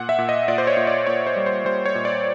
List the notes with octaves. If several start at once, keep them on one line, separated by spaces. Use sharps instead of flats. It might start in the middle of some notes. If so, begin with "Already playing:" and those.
Already playing: A#2 F#5
E5
A#2
D#5
A#2 D5
C5
C#5
A#2
D5
A#2 C#5
C5
G3
C5
G3 C5
C#5
A#2
D5